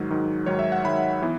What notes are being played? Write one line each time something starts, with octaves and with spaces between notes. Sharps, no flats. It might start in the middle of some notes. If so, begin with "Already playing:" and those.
Already playing: G#2 D#3 F#3
G#2 D#3 F#3
G#2 D#3 F#3 C#5
E5
F#5
G#2 D#3 F#3 B5
E3 B3